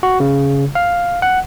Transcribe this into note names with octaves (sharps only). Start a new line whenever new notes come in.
F#4
C#3
F5
F#5